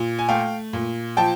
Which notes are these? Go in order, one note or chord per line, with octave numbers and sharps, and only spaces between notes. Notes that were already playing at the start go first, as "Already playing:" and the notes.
Already playing: A#2
G#5
A3 F5 G5
A#2
F3 G5 A5